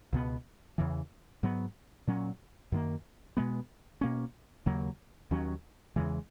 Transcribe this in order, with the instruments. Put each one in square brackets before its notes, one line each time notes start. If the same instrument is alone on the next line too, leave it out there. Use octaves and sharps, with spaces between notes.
[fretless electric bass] C#2 B2 F#3 B3
E2 C#3 E3
G#2 F#3 B3
A#2 F#3 C#4
F#2 D#3 A#3
B2 G#3 B3
B2 A#3 C#4
D#2 C#3 F#3 A#3
D#2 D#3 F#3 C#4
E2 C#3 E3 G#3